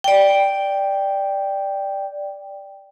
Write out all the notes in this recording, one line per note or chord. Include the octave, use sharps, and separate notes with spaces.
D5 G5